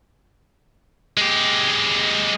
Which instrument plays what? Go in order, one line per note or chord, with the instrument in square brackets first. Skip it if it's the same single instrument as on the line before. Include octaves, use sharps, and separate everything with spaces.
[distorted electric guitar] G#3 G4